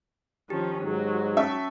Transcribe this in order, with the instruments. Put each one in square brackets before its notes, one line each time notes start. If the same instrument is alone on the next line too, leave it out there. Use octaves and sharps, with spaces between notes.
[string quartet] D#3 F3 C#4 [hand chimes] G4
[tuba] G#2 [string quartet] F#3
[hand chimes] C#4 A5 C#6 [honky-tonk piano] E5